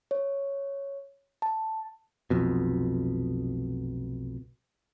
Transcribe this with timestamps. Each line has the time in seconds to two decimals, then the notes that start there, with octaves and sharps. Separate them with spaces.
0.11 C#5
1.42 A5
2.30 F1 B1 F2 B2